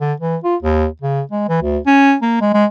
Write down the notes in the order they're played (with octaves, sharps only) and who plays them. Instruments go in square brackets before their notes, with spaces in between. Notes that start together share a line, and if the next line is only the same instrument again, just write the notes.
[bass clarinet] D3
E3
F4
D#2
C#3
G#3
E3
D2
C#4
A#3
G#3
G#3